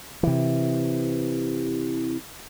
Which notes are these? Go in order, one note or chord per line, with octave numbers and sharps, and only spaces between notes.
C3 E3